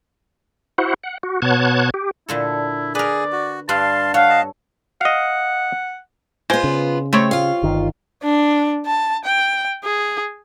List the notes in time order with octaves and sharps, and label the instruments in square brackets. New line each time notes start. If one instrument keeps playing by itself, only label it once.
[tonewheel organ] E4 F#4 C5 F#5
F#5
F#4
B2 B3 C#5 A5 F#6 G#6
G4
[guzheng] A#2 D3 A4 [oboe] E4
[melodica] G#4 [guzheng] A#4 B4 [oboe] D5
[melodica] F#4
[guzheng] G2 G3 D4 [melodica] F5 C6 [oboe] A5
[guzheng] A4 C#5 [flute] F5 [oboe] F#5
[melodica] D#5 A5
[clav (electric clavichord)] D#5 F5 [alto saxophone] F#5
[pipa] G#3 C5 [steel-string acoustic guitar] B3 F4
[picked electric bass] C#3
[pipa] G3 C4 C#5 [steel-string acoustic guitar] A3
[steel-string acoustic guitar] F4 F5
[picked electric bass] G1 D#3
[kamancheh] D4
A5
G5
G#4